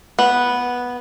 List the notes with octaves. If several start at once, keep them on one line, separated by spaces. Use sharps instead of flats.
B3